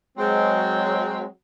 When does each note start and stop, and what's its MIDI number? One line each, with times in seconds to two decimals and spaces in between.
0.18 1.25 54
0.18 1.25 56
0.18 1.25 60